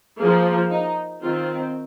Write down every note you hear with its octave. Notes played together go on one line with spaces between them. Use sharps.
F3 A#3 G#4
D#4
D#3 C4 F4